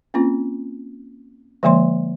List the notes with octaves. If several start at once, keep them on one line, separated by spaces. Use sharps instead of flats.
A#3 C4 C#4 F4
D3 F3 G#3 A#3 C#5 C6